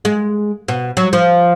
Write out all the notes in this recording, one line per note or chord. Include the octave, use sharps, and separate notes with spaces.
G#3
B2
F#3
F3